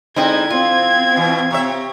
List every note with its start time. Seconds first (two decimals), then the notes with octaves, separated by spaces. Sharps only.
0.16 D3 G#3 C4 D#4 E4 G#6
0.50 C4 F4
1.16 B2 E3
1.51 C3 C#5 E5